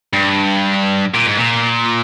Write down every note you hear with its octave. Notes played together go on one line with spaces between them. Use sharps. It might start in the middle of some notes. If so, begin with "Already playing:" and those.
G2
A#2
G#2
A#2